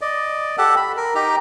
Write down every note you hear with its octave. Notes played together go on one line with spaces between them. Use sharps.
D5 D#5
G4 A4 F#5
B5
A#4
D#4 G4 A#5